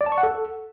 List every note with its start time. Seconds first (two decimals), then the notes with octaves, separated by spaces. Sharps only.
0.01 D5
0.06 A5
0.12 C#6
0.18 F#5
0.23 A4